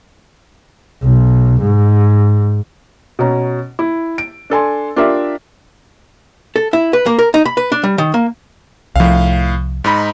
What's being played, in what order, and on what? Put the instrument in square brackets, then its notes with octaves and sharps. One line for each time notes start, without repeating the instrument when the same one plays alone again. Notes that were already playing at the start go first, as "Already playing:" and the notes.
[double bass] B1
G#2
[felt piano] B2 C#4 A#5
E4
D7
D4 A4 G#5 C6
D4 F4 G4 A#4 E5
[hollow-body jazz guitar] A4
E4
B4
A#3
A#4
D#4
B5
B4
D4
G3
D#3
A#3
[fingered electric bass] C2 F3 [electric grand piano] A2 F5
[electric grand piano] G#2 D#4 B5